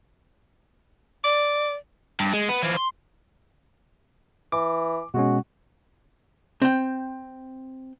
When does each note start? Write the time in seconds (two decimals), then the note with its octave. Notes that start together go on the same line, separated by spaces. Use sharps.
1.24 D5 D6
2.20 G2
2.34 G#3
2.49 B3
2.63 E3 F3
2.77 C6
4.52 E3 D6
5.14 B2 G#3 C#4 F#4
6.62 C4 G5